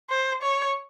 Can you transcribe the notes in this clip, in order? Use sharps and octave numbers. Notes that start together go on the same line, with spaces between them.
C5
C#5